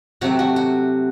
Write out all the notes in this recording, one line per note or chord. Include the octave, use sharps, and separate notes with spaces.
C3 F#3 A3 F#4
F#4
F#4